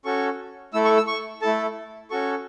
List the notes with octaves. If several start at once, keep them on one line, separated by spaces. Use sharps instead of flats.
C#4 F#4 A4 C#6
A3 E4 A4 E6
C#6
E6
C#6
A3 E4 A4 A5
C#4 F#4 A4 C#6